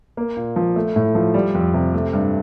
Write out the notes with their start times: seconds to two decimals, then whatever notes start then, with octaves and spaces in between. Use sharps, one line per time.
0.17 A#3
0.37 A#2
0.56 F3
0.76 A3
0.96 A2
1.15 F3
1.34 G3
1.55 F2
1.74 C3
1.94 A3
2.13 G2